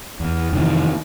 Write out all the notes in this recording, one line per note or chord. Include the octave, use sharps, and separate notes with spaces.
E2
F2 C3 D#3 E3